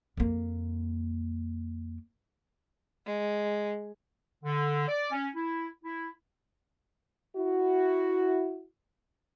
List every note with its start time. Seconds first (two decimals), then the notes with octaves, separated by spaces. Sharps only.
0.17 F2 A#3
3.06 G#3
4.44 D3
4.87 D5
5.11 C#4
5.35 E4
5.84 E4
7.36 E4 F#4